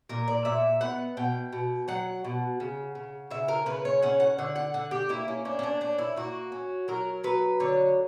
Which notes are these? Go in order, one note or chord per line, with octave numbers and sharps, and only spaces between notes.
A#2 A#4
D5
A#2 E5
B3 F#5
B2 G5
B2
F#3 F#5
B2
C#3
C#3
C#3 E5
A#4
C#3 B4
C#5
C#4 F#5
F#5
D3 F#5
F#5
D3 F#5
G4
A#3 E4
C#4
C#4 D4
C#4
D4
C#4 D4
E4
A#3 F#4
C#4
F#3 A#4
F#3 B4
D3 C#5